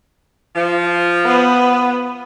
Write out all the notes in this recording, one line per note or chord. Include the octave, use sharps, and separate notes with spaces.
F3
B3 B4